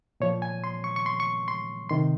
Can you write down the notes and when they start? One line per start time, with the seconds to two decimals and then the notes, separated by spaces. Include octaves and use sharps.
0.20 A#2 F3 C#5
0.42 G#5
0.64 C6
0.84 C#6
0.96 C#6
1.06 C6
1.20 C#6
1.48 C6
1.89 C3 D#3 C6